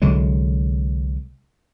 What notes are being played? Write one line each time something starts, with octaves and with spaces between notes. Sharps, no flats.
C2 D3 F#3 G#3